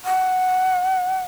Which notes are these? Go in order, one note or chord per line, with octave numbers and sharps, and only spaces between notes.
F#5